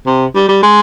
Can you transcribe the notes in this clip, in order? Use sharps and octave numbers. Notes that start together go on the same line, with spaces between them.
C3
G3
G3
G#3